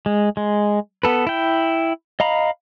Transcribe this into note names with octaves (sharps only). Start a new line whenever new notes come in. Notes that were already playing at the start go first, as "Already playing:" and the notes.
G#3
G#3
B3 A4 B4
E4 G5
D#5 F5 A#5 B5